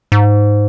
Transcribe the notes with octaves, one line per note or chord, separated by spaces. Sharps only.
G#2